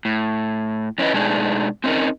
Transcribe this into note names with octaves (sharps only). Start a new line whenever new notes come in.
A2
F2 C#4 E4 B4 D#5
B2 G#3 A3 D4 D#4 G#4
C4 C#4 D#4 A#4